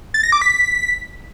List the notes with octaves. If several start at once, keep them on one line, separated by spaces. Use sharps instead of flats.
A6
A#6
D6
B6